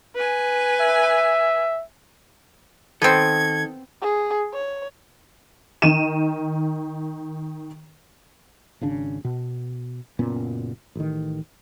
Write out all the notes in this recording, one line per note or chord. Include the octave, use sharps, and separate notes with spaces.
B4 G#5
E5
D#3 B3 C4 A4 G#6
G#4
C#5
D#3 D#7 E7
G#1 C#3 D4
B2
F#1 A#2 B3 C#4
A1 D#3